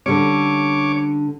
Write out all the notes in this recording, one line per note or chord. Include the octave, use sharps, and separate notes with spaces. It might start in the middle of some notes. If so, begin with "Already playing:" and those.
D3 G3 C#4 C#5 D6